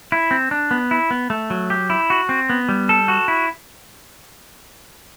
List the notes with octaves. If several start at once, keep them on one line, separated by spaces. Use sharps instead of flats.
E4
C4
D4
B3
E4
B3
A3
F#3
G4
E4
F#4
C4
B3
G3
A4
F#4
E4